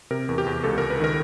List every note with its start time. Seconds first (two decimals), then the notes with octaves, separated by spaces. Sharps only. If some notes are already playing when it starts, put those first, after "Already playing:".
0.11 C3 A#4
0.29 E2
0.38 G4
0.46 E2
0.64 C#2 A4
0.78 C#2 A#4
0.90 B4
1.00 D#3 A#4